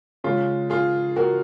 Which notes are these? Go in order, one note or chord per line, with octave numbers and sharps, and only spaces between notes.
C#3 G#3 C#4 F4
F4 G#4
F#4 A#4